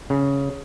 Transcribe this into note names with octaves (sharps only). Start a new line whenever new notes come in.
C#3